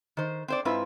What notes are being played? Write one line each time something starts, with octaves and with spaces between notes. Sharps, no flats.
D#3 C5
C4 C5 D5
G#2 C4 E4 F4 B4